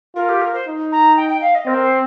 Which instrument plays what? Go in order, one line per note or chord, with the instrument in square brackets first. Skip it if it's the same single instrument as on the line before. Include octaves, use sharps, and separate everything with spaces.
[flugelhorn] F4 [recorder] A#4
[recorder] G4
A#4
C5
[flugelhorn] D#4
[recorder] A#5
G5
G5
F5
D#5
[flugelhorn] C4 [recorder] A#4
[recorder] C5